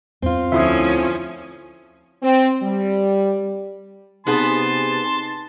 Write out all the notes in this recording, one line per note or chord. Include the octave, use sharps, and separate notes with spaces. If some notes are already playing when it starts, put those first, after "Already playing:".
E2 C4 F4
D2 F3 C#4 E4 E5 C6 D#6
C4
G3
C3 B3 D#4 G#4 B4 A5 C6